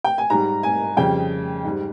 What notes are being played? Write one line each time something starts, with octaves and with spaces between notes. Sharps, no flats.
G5
G#5
G#2 G3 A#5
G#5
F2 C#3 G3 G5
G#2 G3